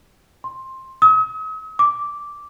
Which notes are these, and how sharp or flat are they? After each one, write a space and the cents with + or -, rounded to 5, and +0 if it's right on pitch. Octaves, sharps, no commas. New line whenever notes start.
C6 +15
D#6 +45
D6 -5